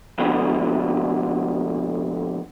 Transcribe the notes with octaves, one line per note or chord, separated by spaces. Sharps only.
F2 B2 D3